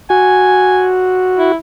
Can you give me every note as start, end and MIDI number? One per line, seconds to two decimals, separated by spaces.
0.10 1.52 66
0.10 0.87 80
1.38 1.56 64